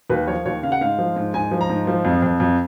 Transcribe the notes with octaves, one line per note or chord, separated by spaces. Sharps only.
D#2 B4
F3 C#5
D#2 C#5
C#3 F5
F#5
G#2 F5
F3
G#2
G#2 G#5
F3
A#5
G#2
F3
F2
F2
F2